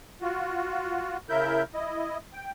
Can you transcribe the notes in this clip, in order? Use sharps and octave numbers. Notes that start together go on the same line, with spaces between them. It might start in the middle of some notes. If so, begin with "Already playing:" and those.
F4 F#4
C#3 E4 A#4 E5 G6
E4 D#5
G5